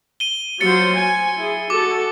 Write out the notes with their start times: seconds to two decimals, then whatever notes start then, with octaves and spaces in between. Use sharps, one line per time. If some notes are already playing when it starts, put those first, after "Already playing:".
0.20 D#7 G7
0.60 F#3 F4 C5 A6 C#7
0.95 G#5
1.38 E4 G#4
1.70 F#4 A4 D6